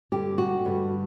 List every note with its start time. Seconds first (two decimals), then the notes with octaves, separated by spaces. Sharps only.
0.12 G2 D3 G3 G4
0.38 F#4
0.65 G2 D3 G3